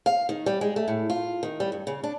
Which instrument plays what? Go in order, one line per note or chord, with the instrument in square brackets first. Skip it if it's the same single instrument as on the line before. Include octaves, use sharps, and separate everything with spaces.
[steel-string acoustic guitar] F5
D#3
G3
G#3
A3
A2
F4
D#3
G3
G2
C#3
D4